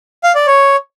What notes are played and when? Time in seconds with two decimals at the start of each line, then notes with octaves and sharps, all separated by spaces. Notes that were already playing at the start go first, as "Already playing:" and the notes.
0.24 F5
0.35 D5
0.47 C#5